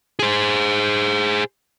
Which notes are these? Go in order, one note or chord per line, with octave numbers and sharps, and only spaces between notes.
G#4 C5